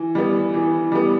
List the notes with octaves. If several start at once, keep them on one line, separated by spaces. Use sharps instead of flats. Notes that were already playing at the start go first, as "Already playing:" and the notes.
Already playing: E3
G3 B3
E3
G3 B3